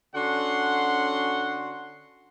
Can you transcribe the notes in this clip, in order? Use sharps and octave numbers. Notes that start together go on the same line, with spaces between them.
D3 C#4 F#4 F#5 C6